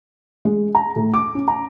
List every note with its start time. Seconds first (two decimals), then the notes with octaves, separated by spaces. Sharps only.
0.45 G#3
0.75 A#5
0.96 A2
1.14 D6
1.35 C#4
1.48 A#5